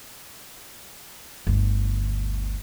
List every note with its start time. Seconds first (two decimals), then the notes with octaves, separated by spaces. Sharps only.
1.47 G1 D2